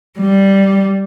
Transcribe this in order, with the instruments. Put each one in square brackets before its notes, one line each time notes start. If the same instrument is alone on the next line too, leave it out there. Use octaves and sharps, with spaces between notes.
[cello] G3